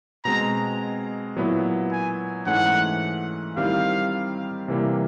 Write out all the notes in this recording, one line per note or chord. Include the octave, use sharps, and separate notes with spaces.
B2 G#3 C4 A#5
A#2 F#3 B3 E4
G#5
G#2 E3 A3 C#4 F#5
D#3 G3 C4 E4 G4 F5
C3 E3 G3 A#3